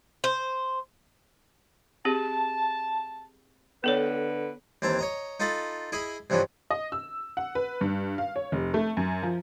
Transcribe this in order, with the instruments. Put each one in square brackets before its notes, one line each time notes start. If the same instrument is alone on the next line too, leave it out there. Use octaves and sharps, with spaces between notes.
[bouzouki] C5
[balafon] C4 G4 G#4 [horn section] A5
[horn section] D3 B4 [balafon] B3 A4 C#5
[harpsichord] D#2 E3 C4 A5 A#5
C#5 D#5 A#5
D#4 F4 A4 D#5 A5 B5
E4 G#4 D#5 G#5 B5
G2 C3 E3 F3 C#4
[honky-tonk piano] D#5
E6
F#5
B4
G2
F5
C#5
F1
A3
F#2
F3